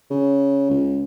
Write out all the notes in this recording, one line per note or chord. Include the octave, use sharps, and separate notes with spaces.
C#3
C#2